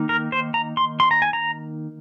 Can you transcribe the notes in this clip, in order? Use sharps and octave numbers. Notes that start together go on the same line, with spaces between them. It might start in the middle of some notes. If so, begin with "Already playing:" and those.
Already playing: D#3 A#3 D#4
A#4
C5
A#5
C6
C6
A#5
G#5
A#5